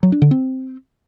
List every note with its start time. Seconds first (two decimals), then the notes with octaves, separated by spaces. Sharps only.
0.03 F#3
0.12 D4
0.22 D3
0.31 C4